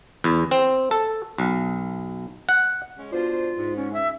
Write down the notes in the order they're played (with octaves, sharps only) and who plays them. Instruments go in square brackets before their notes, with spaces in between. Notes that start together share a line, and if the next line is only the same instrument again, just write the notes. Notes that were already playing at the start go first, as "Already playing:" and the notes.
[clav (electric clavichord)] E2
C4
A4
B1
F#5
[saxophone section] G#3 C#4
[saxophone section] B2 D4 C5 [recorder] F4
[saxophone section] G#2
[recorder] C#4
E5